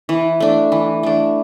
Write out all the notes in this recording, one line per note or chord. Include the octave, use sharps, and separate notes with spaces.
E3
A3 D4
E3
A3 D4